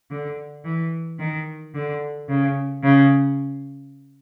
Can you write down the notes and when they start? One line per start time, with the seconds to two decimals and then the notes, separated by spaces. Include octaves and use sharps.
0.11 D3
0.65 E3
1.19 D#3
1.75 D3
2.29 C#3
2.83 C#3